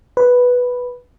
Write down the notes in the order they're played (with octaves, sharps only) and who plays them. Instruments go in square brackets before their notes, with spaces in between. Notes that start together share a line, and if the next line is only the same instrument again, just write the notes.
[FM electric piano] B4